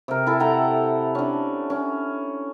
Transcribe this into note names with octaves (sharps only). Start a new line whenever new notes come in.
C3 A#4
E4 A4
A4 F#5 G5 A#5
C#4 D4
C#4